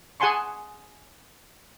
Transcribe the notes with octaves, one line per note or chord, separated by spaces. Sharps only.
G#4 F#5 G#5 A5 C6 C#6